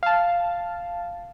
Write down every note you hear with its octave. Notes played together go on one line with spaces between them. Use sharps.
F5 A5